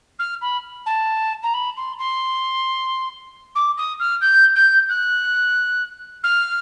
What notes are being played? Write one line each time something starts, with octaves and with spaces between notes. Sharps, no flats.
F6
B5
A5
A#5
B5
C6
C6
D6
D#6
F6
G6
G6
F#6
F6